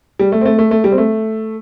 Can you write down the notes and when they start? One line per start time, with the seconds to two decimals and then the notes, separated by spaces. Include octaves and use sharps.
0.19 G3
0.32 A3
0.41 C4
0.45 A3
0.59 A3
0.71 A3
0.84 G3
0.92 C4
0.98 A3